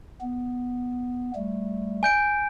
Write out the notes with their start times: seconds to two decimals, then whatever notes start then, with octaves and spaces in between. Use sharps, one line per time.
0.21 B3
1.35 G3 A3
2.03 G#5 G6 D7